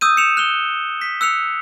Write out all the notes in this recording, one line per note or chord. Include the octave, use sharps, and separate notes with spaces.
D#6 E6 G6 D#7
C#7 E7 F7
F#6 F7 G7
B6
E6 F#6 C#7 F7